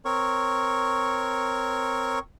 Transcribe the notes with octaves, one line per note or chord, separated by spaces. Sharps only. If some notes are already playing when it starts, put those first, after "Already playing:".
C4 A#4 C#5 C#6